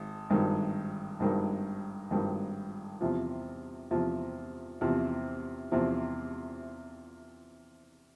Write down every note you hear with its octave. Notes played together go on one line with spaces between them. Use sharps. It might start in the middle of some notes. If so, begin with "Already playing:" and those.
Already playing: G#1
G#1 G2 D#3
G#1 G2 D#3
G#1 G2 D#3
E2 C3 F3
E2 C3 F3
E2 C3 F3
E2 C3 F3